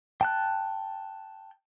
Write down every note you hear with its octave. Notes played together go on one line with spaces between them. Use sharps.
G5 A5 F#6